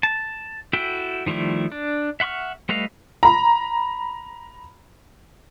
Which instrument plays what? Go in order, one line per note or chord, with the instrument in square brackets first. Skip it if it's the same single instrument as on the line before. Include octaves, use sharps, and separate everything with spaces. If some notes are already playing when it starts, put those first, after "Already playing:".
[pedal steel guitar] A5
E4 F#4 A4 E5 G5
D#3 F3 G3 A3 E4
D4
E5 F#5 C6 C#6 F6
G3 A3 B4 D#5 F5
[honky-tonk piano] A#5 B5